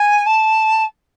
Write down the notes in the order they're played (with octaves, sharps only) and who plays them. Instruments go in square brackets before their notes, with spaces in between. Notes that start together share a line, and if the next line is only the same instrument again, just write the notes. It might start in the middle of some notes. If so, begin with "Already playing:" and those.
Already playing: [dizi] G#5
A5